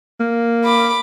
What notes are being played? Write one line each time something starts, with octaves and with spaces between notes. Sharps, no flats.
A#3
B5 D6